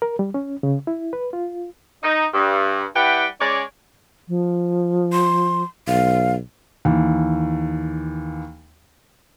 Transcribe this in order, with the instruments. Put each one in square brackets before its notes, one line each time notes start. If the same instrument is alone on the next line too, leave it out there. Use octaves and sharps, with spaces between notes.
[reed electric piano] A#4
G3
C#4
C#3
E4
B4
F4
[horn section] D#4
G2
G3 E4 G4 B4 F#5 G5
G#3 C#4 C#5 D5
[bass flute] F3
[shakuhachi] C6
[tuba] B1 [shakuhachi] F5
[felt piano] D#2 E3